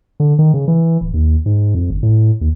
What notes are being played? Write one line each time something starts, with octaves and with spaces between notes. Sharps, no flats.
D3
D#3
C#3
E3
D1
D#2
G#2
F2
G1
A2
D#2